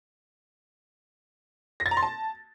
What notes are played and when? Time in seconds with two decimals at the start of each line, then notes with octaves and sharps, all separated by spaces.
1.80 A#6
1.86 A6
1.91 A#5
1.97 C6
2.03 A5